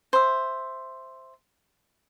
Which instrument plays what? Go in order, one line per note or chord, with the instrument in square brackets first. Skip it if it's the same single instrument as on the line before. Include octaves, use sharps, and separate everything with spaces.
[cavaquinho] C5 E5